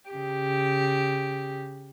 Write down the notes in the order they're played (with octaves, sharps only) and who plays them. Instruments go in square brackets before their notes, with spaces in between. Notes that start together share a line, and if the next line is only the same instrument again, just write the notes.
[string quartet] C#3 G4